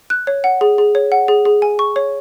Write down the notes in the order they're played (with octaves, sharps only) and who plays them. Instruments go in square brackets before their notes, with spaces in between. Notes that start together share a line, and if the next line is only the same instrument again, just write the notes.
[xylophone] F#6
C#5
F#5
G#4
G#4
C#5
F#5
G#4
G#4
G#5
C#6
C#5